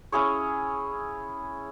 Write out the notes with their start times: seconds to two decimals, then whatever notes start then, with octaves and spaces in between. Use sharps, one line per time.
0.12 C#4 E4 G#4 C#5